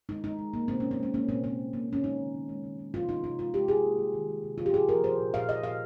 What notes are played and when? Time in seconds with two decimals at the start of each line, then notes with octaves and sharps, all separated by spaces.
0.09 G#3 D#4
0.24 G#3 D#4
0.39 G#3
0.54 G#3 A#3
0.68 D#3 C4
0.80 G#3 C#4
0.91 C4
0.99 G#3 C#4
1.14 A#3 C#4
1.28 A#2 C4
1.44 A#2 C4
1.58 A#3
1.73 A#3
1.88 A#3 C#4
2.04 G#3 D#4
2.18 D#3
2.34 D#3
2.49 G#3
2.64 D#3
2.79 G#3
2.94 C3 F4
3.09 G3 D#4
3.24 C3 D#4
3.39 G#3 F4
3.54 G#3 G4
3.68 G#3 G#4
3.84 A#3
3.99 G3
4.14 D#3
4.29 G#3
4.44 C3
4.58 C3 F4
4.66 G4
4.74 A#2 G#4
4.89 F3 A#4
5.04 F3 C5
5.18 A#2
5.33 A#2 F5
5.49 A#2 D#5
5.63 A#2 F5